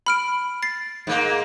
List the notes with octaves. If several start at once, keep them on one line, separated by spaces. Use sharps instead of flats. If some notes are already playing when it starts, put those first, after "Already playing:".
B5 F6 D7
A6 C7
G#2 A#3